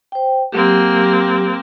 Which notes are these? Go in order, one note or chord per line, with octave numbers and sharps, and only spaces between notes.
C5 G5
F#3 A#3 C4 G4